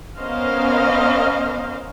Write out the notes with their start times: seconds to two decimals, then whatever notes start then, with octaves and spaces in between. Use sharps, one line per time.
0.20 B3 C#4 A#4 C5 D#5 F5